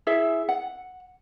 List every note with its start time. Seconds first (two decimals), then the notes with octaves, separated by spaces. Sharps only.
0.07 E4 G#4 E5
0.49 F#5